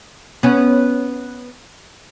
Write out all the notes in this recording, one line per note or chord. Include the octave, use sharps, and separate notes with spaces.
B3 C#4